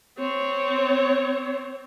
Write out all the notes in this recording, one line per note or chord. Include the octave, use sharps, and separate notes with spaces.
C4 C#5